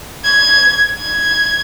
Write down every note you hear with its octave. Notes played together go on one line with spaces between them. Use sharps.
G#6
G#6